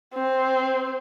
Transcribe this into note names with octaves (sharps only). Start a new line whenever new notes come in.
C4